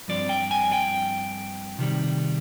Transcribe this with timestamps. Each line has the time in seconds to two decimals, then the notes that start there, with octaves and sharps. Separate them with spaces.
0.08 G2 F3 C4 D5
0.29 G5
0.51 G#5
0.72 G5
1.79 C3 D#3 G3